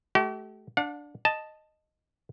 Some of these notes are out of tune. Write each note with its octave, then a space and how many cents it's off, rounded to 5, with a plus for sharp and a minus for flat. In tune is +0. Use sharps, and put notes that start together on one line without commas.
A3 -35 G4 -45
D4 +0 F#5 -45
D#5 -5 A5 +0